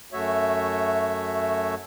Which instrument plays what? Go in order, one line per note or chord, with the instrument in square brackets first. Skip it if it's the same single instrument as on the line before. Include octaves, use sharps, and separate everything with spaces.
[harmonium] F#2 A3 F#4 C#5 E5